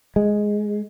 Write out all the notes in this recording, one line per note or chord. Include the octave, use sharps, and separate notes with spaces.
G#3